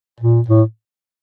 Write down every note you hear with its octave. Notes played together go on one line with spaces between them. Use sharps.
A#2
A2